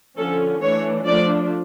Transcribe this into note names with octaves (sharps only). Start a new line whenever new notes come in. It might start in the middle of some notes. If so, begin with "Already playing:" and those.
D3 F3 C#4 A4
E3 A3 D4 C#5
F3 A3 D4 D5